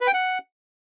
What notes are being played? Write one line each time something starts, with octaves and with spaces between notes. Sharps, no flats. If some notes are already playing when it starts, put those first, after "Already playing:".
B4
G5
F#5